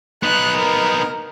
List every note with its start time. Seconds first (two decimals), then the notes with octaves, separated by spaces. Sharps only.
0.23 B3 D#4 F#6
0.57 A#4